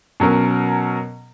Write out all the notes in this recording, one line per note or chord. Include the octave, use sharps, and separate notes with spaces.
B2 F#3 C#4 A#4